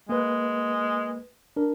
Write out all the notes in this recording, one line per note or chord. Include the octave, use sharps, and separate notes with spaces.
G#3 A#3 B4
D4 A#4